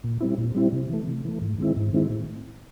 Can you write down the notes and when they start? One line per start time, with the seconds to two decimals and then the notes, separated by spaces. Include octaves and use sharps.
0.04 A#2
0.21 G3 C4 E4
0.38 A#2
0.55 G3 C4 E4
0.73 C3
0.89 E3 A3
1.07 C3
1.25 E3 A3
1.41 G#2
1.58 D#3 G#3 C4 E4
1.76 G#2
1.93 D#3 G#3 C4 E4
2.10 A2